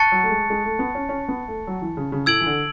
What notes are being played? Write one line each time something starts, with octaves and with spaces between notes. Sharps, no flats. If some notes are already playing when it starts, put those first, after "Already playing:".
Already playing: A5 C#6 F#6 A6 C#7
F#3
A3
G#3
G#3
A3
B3
C#4
C#4
B3
A3
F#3
E3
C#3
C#3
A2 E6 G#6 D7 F#7
E3
D3